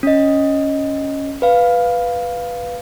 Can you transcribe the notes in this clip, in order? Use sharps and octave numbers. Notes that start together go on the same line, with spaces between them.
C#4 D#5
B4 F5